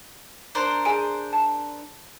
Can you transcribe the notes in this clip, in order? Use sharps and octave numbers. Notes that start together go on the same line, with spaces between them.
D4 A#4 C5
G#4 G#5 D7
A5